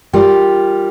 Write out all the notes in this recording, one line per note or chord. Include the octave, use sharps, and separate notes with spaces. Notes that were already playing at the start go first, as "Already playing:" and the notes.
G3 F4 A#4 G5